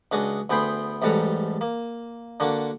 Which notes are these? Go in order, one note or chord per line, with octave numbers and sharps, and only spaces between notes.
C#2 D4 F#4 G#4 D#5
D2 B3 G#4 G5 B5 C6
A1 G#2 G3 A4 F#5 A#5
A#3
D3 A#3 D4 F#4